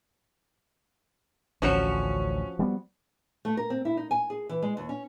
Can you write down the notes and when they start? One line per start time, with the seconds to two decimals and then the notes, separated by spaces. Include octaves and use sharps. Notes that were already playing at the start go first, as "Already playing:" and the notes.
1.62 A1 D2 F3 C#4 F#4 C#7
2.59 G3 B3
3.45 A3
3.57 A#4
3.70 C4
3.85 E4
3.97 D#4
4.11 G#5
4.30 G#4
4.49 E3
4.62 G#3
4.77 D#2
4.89 C#4